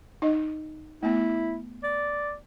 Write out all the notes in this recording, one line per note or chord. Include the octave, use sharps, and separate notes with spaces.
D#4 D#5
A3 B3 E4
D5